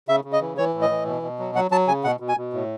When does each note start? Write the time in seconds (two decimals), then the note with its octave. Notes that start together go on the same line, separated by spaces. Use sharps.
0.08 C#3 E5
0.25 C#3
0.33 D#5
0.41 E3
0.57 E3 C#5
0.74 A2
0.82 D#5
0.90 E3
1.06 B2
1.22 B2
1.39 F#3
1.55 F#3 F#5
1.71 F#3 A5
1.87 C#3 G#5
2.04 B2 F#5
2.20 B2
2.28 G#5
2.37 B2
2.53 A2